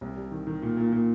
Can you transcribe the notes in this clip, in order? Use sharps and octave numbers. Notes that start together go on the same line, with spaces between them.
C2
G3
D#3
D#3
A#2
A#2
A#2